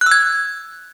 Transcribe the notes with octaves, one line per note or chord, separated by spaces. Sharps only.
F#6
E6
G#6